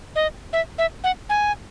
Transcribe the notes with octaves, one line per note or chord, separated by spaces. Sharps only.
D#5
E5
E5
F#5
G#5